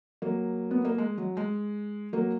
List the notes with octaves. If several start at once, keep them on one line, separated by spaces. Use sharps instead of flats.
F#3 A#3
B3
A#3
G#3
F#3
G#3
F#3 A#3